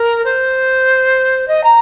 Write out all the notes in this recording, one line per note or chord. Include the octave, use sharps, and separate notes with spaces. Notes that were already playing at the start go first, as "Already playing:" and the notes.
Already playing: A#4
C5
D#5
A#5